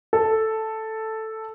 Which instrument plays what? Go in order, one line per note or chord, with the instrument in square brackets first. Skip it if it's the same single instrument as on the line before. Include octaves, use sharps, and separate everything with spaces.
[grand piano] A4